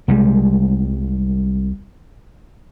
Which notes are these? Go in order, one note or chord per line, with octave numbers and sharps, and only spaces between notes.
C2 G3 G#3